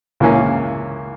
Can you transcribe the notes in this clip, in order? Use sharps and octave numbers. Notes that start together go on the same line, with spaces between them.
C#2 C#3 E3 A#3 C#4